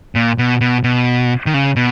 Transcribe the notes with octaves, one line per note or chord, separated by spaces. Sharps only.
A#2
B2
B2
B2
D#3
C#3
B2